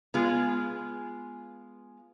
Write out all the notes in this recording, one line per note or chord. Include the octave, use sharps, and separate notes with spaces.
G#3 B3 F4